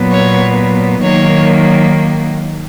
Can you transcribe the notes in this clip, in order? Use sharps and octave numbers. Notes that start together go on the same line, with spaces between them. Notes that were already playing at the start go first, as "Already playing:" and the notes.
Already playing: A#2 F#3 B3
C#5
D#3 F#3 A#3 C#5